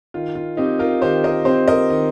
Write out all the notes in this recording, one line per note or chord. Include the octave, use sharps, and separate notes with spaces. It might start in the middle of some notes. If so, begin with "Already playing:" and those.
D#3 F4
F4
C4 D#4 G4
F4 A#4
D#3 G4 C5
A#4 D#5
C4 G4 C5
A#4 D#5
D#3